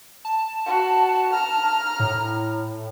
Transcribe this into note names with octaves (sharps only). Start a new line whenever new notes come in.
A5
F#4
A#5 F6
A2